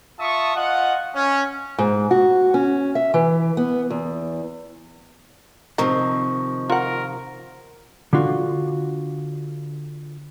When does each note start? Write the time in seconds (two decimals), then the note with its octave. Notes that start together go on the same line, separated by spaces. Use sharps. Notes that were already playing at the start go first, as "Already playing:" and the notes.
0.19 F4 E5 A5 C#6 D#6
0.55 F4 D#5 F#5
1.14 C#4
1.78 G#2
2.11 F#4
2.54 C#4
2.95 E5
3.14 E3
3.57 B3
3.90 E2
5.78 C3 D#3 F3 A#4 D#5 C#6
6.70 F4 A#4 F#5
8.13 D3 D4 F4 F#4